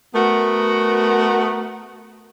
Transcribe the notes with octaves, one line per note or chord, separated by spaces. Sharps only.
A3 B3 F#4 A#4